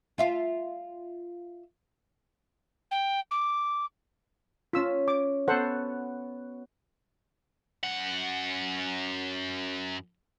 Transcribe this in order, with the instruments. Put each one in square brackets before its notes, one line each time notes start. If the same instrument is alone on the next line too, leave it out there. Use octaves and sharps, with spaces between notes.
[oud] F4 E5 F5
[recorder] G5
D6
[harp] C#4 B6 [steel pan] F4 E6
[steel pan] D6
[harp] B3 F#4 [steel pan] A4 C5 F#5
[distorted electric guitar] F#2 F#5